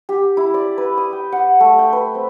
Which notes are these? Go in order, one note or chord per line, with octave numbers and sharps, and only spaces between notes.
G4
E4
D5
B4
D#6
G5
F#5
A3
G5
B4
C4